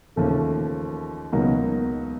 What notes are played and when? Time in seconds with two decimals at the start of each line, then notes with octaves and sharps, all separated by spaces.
0.16 D#2 C#3 F3 A3
1.32 C#2 B2 F#3 A#3 D#4